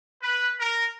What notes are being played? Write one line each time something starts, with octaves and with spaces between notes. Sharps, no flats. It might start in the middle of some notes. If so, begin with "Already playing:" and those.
B4
A#4